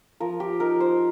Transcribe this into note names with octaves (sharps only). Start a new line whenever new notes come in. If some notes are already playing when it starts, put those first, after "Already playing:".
F3 A#4
G4
D#4 A#4
C5